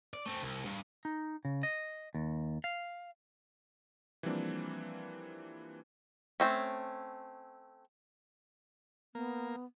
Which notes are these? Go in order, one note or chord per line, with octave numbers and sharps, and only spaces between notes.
D5
A3 C4
C2
G2
D#4
C#3
D#5
D#2
F5
E3 F3 G3 A#3 C4 D4
A3 C4 C#4
A#3 B3